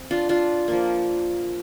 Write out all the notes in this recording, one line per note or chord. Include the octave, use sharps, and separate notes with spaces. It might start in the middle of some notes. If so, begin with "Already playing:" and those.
Already playing: C4
D4 F4
D4 F4
F3 A#3